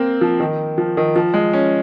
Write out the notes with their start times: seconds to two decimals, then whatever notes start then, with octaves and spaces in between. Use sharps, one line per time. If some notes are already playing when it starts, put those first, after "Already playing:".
Already playing: A#3 C4
0.21 F3
0.40 D#3
0.78 F3
0.97 D#3
1.16 F3
1.34 G#3
1.53 C#4